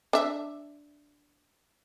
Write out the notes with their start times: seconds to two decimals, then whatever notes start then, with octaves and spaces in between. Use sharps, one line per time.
0.13 D4 E5